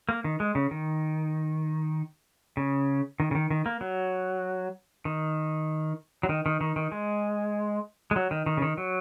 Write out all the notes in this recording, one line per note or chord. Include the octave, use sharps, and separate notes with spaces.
A#3
D#3
G#3
C#3
D#3
C#3
D#3
C#3
D#3
D#3
A#3
F#3
D#3
F#3
D#3
D#3
D#3
D#3
G#3
G#3
F#3
D#3
D#3
C#3
D#3
F#3